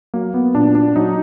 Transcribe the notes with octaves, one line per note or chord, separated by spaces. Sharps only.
F#3 A#3
B3
A#2 D4
D4
F#3 D#4